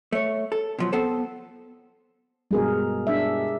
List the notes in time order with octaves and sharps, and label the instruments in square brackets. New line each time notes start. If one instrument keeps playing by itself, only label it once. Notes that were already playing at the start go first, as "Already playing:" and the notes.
[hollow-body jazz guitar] A3 C#5
A4
B2 F3 F#3
B3 C4 A4 C5
[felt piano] G2 B2 [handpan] G#3 G#4 A#4
[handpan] D4 E5